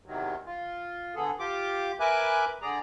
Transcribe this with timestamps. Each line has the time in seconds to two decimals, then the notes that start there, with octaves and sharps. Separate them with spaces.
0.06 E2 C3 D#3 F#3
0.46 F4
1.15 D3 B3 G#4 A4
1.39 F4 G4 D6
2.00 A#4 B4 E5 G#5 D6 F#6
2.62 D3 G#4 D5 A#5